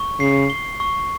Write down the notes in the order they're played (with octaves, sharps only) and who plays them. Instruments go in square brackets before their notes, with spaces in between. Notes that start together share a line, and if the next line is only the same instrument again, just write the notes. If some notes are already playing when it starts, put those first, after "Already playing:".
Already playing: [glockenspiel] C#6
[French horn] C#3 [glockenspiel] C7
[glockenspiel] G7
C#6